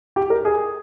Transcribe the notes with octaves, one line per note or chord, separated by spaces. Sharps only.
G4
A#4
G#4